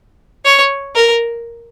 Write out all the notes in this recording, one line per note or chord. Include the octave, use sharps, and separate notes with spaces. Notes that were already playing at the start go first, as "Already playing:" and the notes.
C#5
A#4